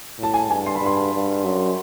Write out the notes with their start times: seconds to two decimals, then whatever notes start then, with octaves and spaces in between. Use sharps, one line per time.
0.18 A2 A5
0.34 G#5
0.50 G2 G#5
0.66 C6
0.76 B5
0.81 G2
0.86 C6
1.13 G2
1.44 F#2